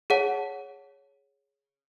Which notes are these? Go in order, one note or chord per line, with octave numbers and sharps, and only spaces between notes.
G#4 C#5 F#5 A5